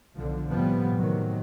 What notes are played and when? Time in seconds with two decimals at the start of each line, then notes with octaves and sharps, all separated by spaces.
0.15 B1 D3 F3
0.48 A2 C3 F3 G3 B3
1.00 A2 C3 D#3 F#3